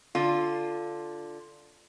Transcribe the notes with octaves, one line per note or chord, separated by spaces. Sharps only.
D3 F4